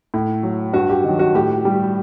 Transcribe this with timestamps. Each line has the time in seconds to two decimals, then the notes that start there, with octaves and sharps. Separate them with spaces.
0.14 A2
0.43 F#3
0.73 G2 F#4
0.89 G4
1.04 D#3 F#3
1.19 F#4
1.35 A2 G4
1.65 G3